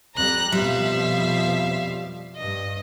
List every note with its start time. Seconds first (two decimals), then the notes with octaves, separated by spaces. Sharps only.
0.16 F2 G3 A#5 F#6
0.52 F2 B2 F3 G3 E5 F5
2.37 G2 D#5